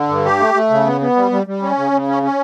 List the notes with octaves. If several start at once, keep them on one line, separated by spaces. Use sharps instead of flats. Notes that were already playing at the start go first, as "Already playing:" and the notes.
Already playing: D3
G2
G4
A3
A3
C#3
B3
B3
G3
G3
G3
C#4
C#3
C#3
C#4
C#4